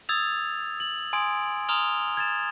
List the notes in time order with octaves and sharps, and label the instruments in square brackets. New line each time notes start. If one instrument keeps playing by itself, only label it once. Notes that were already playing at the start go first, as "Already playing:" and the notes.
[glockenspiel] D#6 E6 G#6 A6 F7
F#7
G#5 C6 D#6 G#6 D7
A#5 C6 D#6 F6 F7 G7
G#6 A6 E7